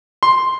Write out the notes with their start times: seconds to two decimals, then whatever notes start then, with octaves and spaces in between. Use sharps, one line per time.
0.23 C6